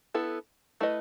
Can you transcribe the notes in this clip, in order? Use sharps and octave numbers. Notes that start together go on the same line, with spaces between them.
B3 E4 A4
A3 E4 B4 D#5